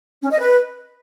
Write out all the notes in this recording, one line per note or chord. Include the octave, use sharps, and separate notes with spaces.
C#4
D#5
B4